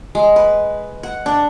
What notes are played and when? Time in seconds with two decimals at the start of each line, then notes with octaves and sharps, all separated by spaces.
0.15 G#3
0.36 B4
1.03 F#5
1.26 D4